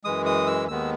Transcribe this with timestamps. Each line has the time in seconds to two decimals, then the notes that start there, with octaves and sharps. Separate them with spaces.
0.04 F#2 E3 G#3 D#6
0.26 D#6
0.47 E6
0.68 D#2 D#3 G#3 B3 E6